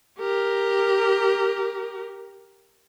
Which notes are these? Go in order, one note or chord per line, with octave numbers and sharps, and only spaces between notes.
G4 A#4